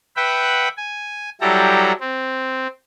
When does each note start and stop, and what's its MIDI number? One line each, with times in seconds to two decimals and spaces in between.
0.16 0.68 71
0.16 0.68 76
0.16 0.68 78
0.16 0.68 79
0.16 0.68 83
0.77 1.30 80
1.41 1.92 54
1.41 1.92 55
1.41 1.92 64
1.41 1.92 67
1.41 1.92 69
1.41 1.92 82
2.00 2.67 60